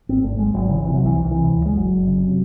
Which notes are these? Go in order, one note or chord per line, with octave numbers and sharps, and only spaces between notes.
G#1 C4
G#1 A3
G#1 G#3
G#1 F#3
C#3 E3
C3 E3
F#3
C2
E3
C2
D#3
C3 E3
C#2
C#2 G#3
F#1 F#3
F#1
C#3
C3